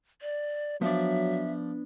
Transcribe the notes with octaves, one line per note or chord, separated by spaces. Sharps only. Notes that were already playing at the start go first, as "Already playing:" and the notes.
D5
F3 F#3 B3 D4 D5 E5